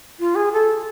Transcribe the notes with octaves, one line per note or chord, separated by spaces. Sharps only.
F4
G#4
A4